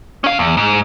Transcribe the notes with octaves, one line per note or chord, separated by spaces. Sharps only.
C#4 F5
E2
G#2